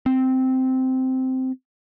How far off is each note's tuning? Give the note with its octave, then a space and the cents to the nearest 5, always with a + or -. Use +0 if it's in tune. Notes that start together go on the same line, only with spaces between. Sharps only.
C4 -10